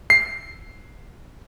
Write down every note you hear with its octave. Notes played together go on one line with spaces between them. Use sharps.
C7